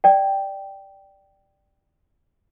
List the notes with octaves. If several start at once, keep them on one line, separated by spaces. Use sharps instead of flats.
D5 G5